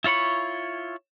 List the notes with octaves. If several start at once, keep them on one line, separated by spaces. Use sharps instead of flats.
E4 F4 C#5 B5 C#6